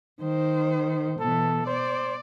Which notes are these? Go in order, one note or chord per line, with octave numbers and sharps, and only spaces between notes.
D#3 C5
B2 E3 A4
C5 D5